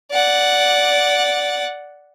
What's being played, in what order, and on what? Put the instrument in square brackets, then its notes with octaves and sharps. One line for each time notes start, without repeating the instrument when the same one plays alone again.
[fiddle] D5 F#5